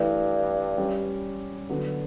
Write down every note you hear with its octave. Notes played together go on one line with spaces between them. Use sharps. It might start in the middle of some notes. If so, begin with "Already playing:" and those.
Already playing: G2 E3 A3 E4
G3 C#4 G4
D3 F#3 B3 F#4 A4